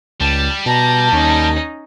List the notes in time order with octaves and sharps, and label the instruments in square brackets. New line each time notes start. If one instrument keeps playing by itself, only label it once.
[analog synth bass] C#2 [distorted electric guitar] G3 [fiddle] A5
[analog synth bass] B2 [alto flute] A5 [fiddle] A#5
[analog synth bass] D#2 [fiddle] C#4 D#4